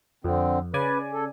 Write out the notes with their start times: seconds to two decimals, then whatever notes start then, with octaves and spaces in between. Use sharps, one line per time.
0.24 F2 D3 C4
0.74 C#3 B4 D5 G#5
1.13 A4